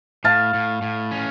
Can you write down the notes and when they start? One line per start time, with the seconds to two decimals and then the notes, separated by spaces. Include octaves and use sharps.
0.24 A2 F5 A5
0.54 A2
0.82 A2
1.11 C#4